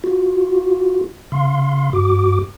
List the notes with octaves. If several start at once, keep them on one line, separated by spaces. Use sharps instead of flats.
F4 F#4
C#3 F5 C6
G2 F#4 D6